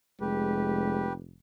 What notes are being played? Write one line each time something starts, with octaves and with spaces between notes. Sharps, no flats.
F1 G#3 G4 B4